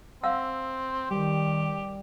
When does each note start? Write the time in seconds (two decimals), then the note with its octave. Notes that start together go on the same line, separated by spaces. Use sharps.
0.24 C4 F5 F#5 E6
1.11 D#3 G3 G4